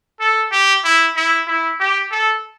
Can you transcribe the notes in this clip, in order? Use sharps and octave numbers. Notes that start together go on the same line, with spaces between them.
A4
G4
E4
E4
E4
G4
A4